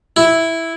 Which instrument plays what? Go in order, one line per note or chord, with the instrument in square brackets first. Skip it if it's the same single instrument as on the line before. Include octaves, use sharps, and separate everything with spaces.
[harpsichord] E4